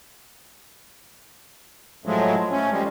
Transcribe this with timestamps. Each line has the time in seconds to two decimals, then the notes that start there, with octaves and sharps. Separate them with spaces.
2.06 A2 F3 F#3 G#3 A3
2.52 A3 C#4
2.71 F3 G3 G#3